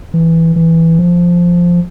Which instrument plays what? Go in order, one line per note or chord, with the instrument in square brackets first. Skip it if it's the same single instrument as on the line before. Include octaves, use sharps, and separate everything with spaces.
[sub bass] E3
E3
F3